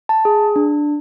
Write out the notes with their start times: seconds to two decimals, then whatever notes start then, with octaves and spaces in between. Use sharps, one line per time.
0.09 A5
0.25 G#4
0.56 D4